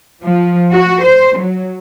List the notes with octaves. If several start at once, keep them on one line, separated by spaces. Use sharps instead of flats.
F3
F#4
C5
F#3